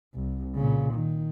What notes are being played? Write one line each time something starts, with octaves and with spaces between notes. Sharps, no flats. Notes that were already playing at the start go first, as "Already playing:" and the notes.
C2
A#2 C#3
D#3